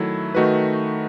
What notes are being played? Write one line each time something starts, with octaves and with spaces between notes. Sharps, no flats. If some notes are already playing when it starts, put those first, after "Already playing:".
Already playing: D#3 F#3 A3 E4 A4
D#3 A3 D#4 F#4 B4